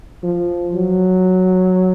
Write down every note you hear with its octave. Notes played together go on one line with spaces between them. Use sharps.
F3
F#3